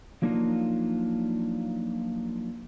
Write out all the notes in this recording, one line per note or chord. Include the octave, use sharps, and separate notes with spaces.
F3 F#3 A#3 D4 D#4 F4